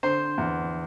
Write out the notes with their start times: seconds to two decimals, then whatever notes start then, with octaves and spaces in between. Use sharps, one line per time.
0.03 D3 C5
0.38 E2